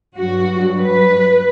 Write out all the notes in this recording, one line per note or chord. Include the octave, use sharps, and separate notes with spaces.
G2 F#3 F#4
B4